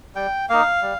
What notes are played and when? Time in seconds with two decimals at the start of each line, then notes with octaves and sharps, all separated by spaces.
0.15 G3 G5
0.49 A#3 D#4 F5
0.82 G3